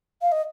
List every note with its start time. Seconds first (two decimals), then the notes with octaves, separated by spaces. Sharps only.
0.21 F5
0.31 D#5